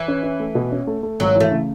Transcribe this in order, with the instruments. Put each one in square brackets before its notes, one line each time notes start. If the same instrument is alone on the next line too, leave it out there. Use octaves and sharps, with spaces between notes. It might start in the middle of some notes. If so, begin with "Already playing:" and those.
Already playing: [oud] E3
[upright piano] C#4
C#4
A3
B2
C#4
A3
A3
[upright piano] G#1 [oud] F#3
[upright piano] E3 [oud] A3
[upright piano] C#3